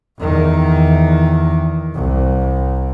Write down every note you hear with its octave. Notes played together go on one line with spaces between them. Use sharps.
E2 D#3
C2